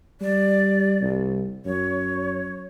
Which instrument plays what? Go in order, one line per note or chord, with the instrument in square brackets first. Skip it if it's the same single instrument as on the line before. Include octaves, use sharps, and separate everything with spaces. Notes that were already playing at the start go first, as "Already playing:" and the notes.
[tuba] G3 [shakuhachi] D5
[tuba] C2
[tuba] F#2 [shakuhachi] C#5